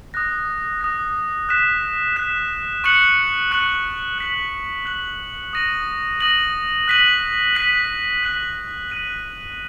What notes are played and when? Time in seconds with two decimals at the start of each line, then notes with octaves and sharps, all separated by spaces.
0.14 D#6 F#6 A#6
0.81 D#6 F#6 A#6
1.49 F#6 B6 E7
2.16 F#6 B6 E7
2.84 C#6 F#6 C#7 F#7
3.51 C#6 F#6 C#7 F#7
4.18 F#6 B6 F#7
4.85 F#6 B6 F#7
5.53 D#6 A#6 D#7 F#7
6.21 D#6 A#6 D#7 F#7
6.88 F#6 B6 D#7 F#7
7.55 F#6 B6 D#7 F#7
8.23 F#6 B6 D#7 F#7
8.90 F#6 B6 D#7 F#7